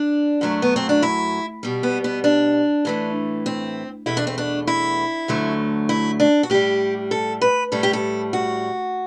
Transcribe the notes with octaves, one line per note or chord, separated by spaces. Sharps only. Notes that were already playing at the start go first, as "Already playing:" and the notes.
Already playing: D4
F#2 F#3 A3
B3
C4
D4
E4
B2 G3
B3
B3
D4
A2 E3 A3
C4
E2 B2 A3 E4
D4
C4
D4
E4
D2 D3 F#3 A3
E4
D4
F#4
A2 G3 G4
A4
B4
A2 G3 A4
G4
A4
F#4